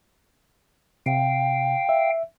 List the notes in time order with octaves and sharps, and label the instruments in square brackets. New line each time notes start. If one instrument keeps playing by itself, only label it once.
[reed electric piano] C3 [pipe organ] F5 G5
[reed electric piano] E5